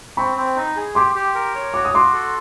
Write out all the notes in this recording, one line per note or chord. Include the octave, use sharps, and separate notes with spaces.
C4 B5 C#6
C4
D#4
G#4
G4 C6 D6
G4
A#4
C#5
F#4 D6
D#6
F#4 C6 D6
A4